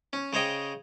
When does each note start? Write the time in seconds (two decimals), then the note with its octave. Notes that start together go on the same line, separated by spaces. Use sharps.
0.13 C#4
0.33 C#3 C5 C#5 D#5 G5